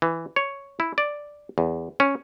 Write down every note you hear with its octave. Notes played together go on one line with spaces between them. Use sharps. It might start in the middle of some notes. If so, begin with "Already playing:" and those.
E3
C#5
E4
D5
E2
C#4